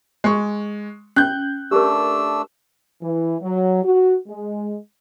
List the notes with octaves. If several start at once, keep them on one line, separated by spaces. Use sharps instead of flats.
G#3 C#6
C#4 F#6 G6
A3 D4 G4 A#4 E6
E3
F#3
F#4
G#3